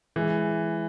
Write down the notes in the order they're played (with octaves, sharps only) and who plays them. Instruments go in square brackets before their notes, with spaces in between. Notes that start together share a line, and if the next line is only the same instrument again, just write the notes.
[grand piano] E3 [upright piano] G#3